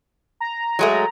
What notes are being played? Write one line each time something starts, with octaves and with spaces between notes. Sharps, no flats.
A#5
F#3 G#3 A3